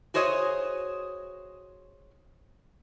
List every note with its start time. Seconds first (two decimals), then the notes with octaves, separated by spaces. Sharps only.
0.14 F#4 G#4 C5 C#5 D#5